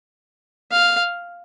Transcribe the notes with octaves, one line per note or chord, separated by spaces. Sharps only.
F5